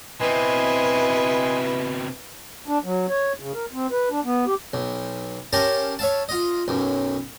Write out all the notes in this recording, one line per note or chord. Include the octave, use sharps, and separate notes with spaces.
B2 C4 E4 B4 D#5 G#5 C6
D4
F#3
C#5
C#3
A#4
C4
B4
D4
B3
G4
B1
C#4 G4 A#4 A5 A#5 C6
C#5 E5 F5 A5
F4 D#5
B1 F#2